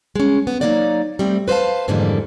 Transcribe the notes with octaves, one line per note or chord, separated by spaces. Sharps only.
G#3 C#4
B3
F#3 A3 A#3 D#4 C#5 D5
G3 A3 C4
B4 C5 D5 F5 A5
F2 G#2 D3 E3 G3 A#3